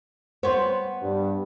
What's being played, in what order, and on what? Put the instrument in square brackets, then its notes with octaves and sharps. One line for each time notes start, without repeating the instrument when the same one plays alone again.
[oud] B3 C#5 [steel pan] C5
[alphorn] G2